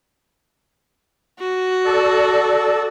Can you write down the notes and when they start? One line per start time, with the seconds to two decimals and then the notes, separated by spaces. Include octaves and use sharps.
1.39 F#4
1.85 A4 D5